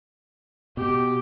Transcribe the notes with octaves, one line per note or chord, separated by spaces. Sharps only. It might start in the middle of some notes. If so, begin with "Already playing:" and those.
B2 G4